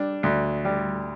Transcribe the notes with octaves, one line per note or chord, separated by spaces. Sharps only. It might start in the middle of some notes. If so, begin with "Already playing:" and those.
Already playing: G3 D4
D2
G3